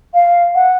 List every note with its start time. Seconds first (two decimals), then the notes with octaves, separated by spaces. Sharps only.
0.14 F5
0.55 F#5